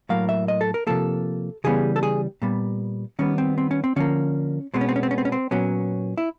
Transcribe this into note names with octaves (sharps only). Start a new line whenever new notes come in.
A2 F#3 A#3 F5
E5
D#5
A4
A#4
C3 F3 A#3 A4
C#3 E3 G3 B3 G#4
A4
G#4
A#2 G3 B3
D#3 G3 B3 C#4
C4
C4
C#4
C4
D3 F3 A#3 C#4
B2 G#3 B3 C4
C#4
C4
C#4
C4
C#4
C4
C#4
C4
A#2 F#3 B3 C#4
E4